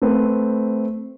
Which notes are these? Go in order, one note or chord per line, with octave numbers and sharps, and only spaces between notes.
A3 C4 B4 C5